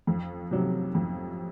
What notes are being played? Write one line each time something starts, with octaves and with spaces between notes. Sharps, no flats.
F2
C3 F#3
F2